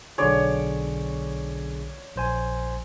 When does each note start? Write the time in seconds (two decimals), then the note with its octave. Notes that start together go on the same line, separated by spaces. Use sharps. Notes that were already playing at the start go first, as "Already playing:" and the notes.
0.18 B1 D3 G#4 C#5 D5
2.16 A#1 C5 G#5